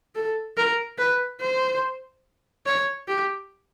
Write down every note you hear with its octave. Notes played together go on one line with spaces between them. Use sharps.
A4
A#4
B4
C5
C#5
G4